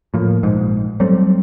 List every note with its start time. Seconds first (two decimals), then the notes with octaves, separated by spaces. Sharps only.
0.14 A2 F3 A#3
0.43 A#1 G#2
1.00 F#3 G3 A3 C4